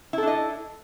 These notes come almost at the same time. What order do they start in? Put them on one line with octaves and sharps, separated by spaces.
E4 A4 D4 D#5